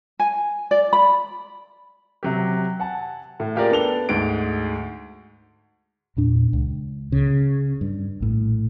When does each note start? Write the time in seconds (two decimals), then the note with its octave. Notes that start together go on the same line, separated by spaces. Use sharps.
0.19 G#5
0.71 D5
0.93 B5
2.23 C3 F#3 G4
2.80 F#5 G#5 A5
3.40 A2
3.55 A#3 F4 G4 G#4 A#4 D5
3.71 B3 D4 A4 F7 G7
4.09 D2 G#2 D7
6.17 E2 A#2 D4
6.53 C#2
7.12 C#3
7.81 G2
8.20 A#1 A2